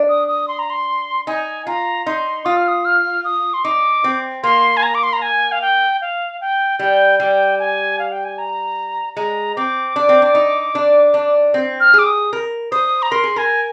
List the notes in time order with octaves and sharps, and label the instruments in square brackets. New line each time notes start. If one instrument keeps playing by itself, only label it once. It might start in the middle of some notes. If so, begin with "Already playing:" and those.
Already playing: [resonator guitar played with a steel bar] D4
[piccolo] D#6
D#6
C6
A#5
C6
[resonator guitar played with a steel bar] D#4 [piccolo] G#5
[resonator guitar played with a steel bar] F4 [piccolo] A#5
[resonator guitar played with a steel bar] D#4 [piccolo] C6
[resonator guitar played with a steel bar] F4 [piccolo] D#6
[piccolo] F6
D#6
F6
D#6
C6
[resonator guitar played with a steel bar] D#4 [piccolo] D6
[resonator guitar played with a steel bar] C4
[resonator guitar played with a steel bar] A#3 [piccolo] C6
[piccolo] G#5
A#5
D6
C6
A#5
G#5
F5
G5
F5
G5
[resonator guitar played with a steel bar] G3 [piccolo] G5
[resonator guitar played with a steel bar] G3 [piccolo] G5
[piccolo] G#5
F5
G5
G#5
A#5
[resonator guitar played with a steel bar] G#3 [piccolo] A#5
[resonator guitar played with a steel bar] C4 [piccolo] D6
[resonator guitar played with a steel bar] D4
C4
D4
D#4
D4
D4
C4
[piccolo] F6
[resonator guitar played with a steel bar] G#4 [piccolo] D6
[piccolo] D#6
[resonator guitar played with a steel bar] A#4
[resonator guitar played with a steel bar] C5 [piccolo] D#6
[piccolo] A#5
[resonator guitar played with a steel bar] A#4 [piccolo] C6
[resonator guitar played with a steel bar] G#4
[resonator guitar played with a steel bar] A#4 [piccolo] G#5